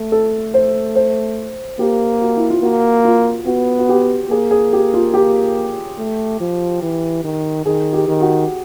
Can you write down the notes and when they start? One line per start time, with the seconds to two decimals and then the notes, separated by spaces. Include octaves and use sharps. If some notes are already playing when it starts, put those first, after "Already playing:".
Already playing: A3
0.12 A4
0.54 C5
0.96 C5
1.79 A#3 G4
2.21 F#4
2.37 E4
2.50 F4
2.62 A#3 F#4
3.05 F4
3.46 B3 F#4
3.79 F#4
3.89 G4
4.30 A#3 G#4
4.51 G#4
4.73 G4
4.94 F4
5.14 G4
5.98 A3
6.40 F3
6.82 E3
7.24 D#3
7.66 D#3 G#4
7.93 G4
8.08 D#3
8.21 F#4